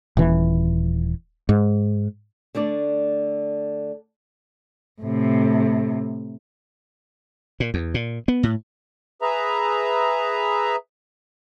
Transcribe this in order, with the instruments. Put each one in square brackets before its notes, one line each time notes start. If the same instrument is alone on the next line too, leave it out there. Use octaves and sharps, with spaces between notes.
[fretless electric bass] D#1 E3
G#2
[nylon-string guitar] D3 A3 D4 D5
[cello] A2 C3
[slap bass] A#2
E2
A#2
B3
A2
[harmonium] G#4 B4 E5 A#5